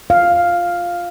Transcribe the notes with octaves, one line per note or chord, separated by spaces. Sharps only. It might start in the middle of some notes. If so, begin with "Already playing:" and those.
F5